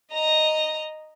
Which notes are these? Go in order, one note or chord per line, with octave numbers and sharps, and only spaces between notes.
D#5 A#5